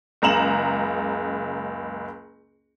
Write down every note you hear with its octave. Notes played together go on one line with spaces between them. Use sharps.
F#1 C#2 A#5 E7 F#7